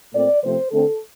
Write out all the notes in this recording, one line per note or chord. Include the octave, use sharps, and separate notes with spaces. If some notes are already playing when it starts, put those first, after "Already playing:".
A#2 A3 C4 D5
C3 F3 A3 C4 C5
D3 A3 C4 A4